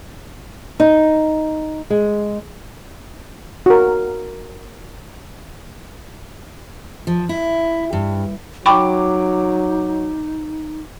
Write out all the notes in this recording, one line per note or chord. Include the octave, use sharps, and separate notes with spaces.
D#4
G#3
F#4 A#4
F3
E4
G2
F#3 D#4 G5 B5 C#6 D6